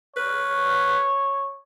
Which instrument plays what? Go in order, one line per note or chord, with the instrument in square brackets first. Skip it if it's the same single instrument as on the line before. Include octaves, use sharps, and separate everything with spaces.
[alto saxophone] B4 [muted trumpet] C#5